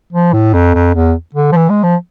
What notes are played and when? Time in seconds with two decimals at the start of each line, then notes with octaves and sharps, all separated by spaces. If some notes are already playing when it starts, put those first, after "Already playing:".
0.12 F3
0.33 A2
0.54 F2
0.74 F2
0.94 E2
1.35 D3
1.52 F3
1.56 E3
1.69 G#3
1.83 F3